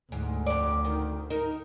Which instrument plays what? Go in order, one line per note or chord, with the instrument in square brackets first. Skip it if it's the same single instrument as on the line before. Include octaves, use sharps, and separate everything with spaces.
[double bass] D2 [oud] G#2
[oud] F2 D5
D#3
D#4 A#4